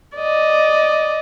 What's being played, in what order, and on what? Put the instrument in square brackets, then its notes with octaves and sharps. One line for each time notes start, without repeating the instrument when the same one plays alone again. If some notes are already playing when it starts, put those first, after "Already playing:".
[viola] D5 D#5